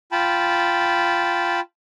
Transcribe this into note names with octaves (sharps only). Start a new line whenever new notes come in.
F4 G5 A5 B5